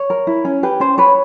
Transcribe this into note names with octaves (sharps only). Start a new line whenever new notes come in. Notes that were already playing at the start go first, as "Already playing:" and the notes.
Already playing: C#5
A#4
E4
C#4
G4 B4
C#4 C5
B4 C#5